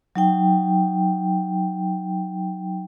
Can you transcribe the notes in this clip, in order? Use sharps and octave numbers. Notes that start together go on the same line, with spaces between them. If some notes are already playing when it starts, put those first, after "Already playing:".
F#3 D#4 G5